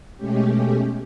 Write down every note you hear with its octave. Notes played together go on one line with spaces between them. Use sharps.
B2 G#3 A3 C#4 G4